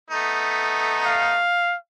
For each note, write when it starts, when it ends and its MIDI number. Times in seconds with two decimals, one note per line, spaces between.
0.11 1.42 57
0.11 1.42 59
0.11 1.42 63
1.05 1.76 77